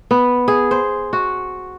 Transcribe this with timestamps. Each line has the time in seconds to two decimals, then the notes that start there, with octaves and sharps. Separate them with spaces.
0.11 B3
0.48 G#4
0.71 C5
1.13 F#4